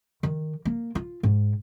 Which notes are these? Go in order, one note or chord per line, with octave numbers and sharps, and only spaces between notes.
D#3
A#3
F4
G#2